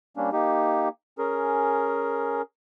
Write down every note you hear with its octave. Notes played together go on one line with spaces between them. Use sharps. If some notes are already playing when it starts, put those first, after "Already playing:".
G3 A#3 C#4 D4
A#3 D#4 G4
C#4 G#4 A#4